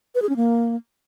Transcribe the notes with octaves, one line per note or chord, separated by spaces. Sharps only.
B4
G#4
C#4
A#3